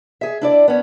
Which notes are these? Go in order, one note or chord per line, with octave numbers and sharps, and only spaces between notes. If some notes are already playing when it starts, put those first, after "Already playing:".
G#4 E5
D4 E4 D5
B3 C#4